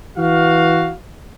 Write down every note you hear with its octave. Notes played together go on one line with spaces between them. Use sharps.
E3 F#4 F5